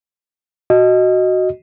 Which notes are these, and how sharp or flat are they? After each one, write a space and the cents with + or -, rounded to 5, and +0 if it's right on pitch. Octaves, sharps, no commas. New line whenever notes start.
F#4 +0 D#5 +0